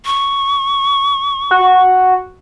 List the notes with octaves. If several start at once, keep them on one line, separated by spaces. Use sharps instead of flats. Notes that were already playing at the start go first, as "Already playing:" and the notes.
C#6
F#4